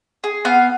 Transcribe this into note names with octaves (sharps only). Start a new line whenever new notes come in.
G#4
B3 F5